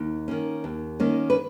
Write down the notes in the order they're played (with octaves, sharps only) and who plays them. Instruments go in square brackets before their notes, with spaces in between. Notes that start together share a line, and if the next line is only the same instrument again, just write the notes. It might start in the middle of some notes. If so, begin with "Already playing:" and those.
Already playing: [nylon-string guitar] D#2
D#3 A#3 C#4
D#2
D#3 A#3 C#4
B4